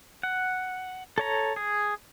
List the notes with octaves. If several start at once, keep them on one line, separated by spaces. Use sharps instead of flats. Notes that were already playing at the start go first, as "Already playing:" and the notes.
F#5
A4 C#5 A#5
G#4